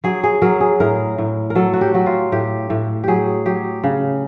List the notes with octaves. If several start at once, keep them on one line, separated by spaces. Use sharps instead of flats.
F#3 G#4
G#4
F#3 A#4
G#4
A2 A#4
A2
A#4
F#3 A4
F#4
G4
F#3 F#4
F4
A2 G4
A2
F#3 G4 G#4
F#3 G4
C#3